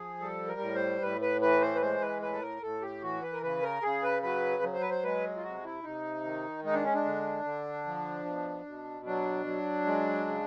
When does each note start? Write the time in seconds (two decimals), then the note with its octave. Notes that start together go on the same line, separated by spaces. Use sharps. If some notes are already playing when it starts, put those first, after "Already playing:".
Already playing: F3 G#4
0.20 G3 A4
0.48 A#4
0.60 A2
0.75 C5
1.02 A2 B4
1.21 B4
1.41 E3 B4
1.61 C5
1.75 B4
1.81 G#3 C5
2.01 B4
2.21 A2 B4
2.32 A4
2.41 A#4
2.62 A2 A4
2.82 G4
3.02 E3 F#4
3.22 B4
3.32 A#4
3.42 C#3 B4
3.63 A#4
3.82 C#3 G#4
4.03 B4
4.22 F#3 B4
4.63 F#3
4.73 C5
4.81 B4
4.90 C5
5.03 G#3 B4
5.37 F4
5.43 C3 F#4
5.64 E4
5.83 C3 D#4
6.24 D#3
6.64 G#3 D#4
6.74 D4
6.84 C#4
6.94 D4
7.05 D3
7.44 D3
7.85 F3
8.25 B2
8.66 B2
9.06 F#3 D4
9.46 F#3
9.86 G#3
10.27 C#3